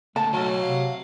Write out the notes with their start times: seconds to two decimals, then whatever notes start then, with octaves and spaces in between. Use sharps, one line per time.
0.16 C#3 A3 A5
0.33 B1 F#3
0.62 C3 F5